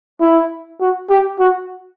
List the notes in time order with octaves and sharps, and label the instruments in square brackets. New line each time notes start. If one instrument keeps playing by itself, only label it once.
[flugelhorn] E4
F#4
G4
F#4